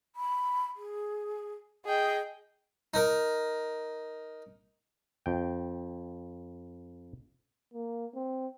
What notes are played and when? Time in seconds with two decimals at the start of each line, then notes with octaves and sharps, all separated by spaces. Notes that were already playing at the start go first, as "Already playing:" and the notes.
0.16 B5
0.76 G#4
1.85 G#4 D#5 G5
2.94 D#4 A#4
5.26 F2 G5
7.74 A#3
8.15 C4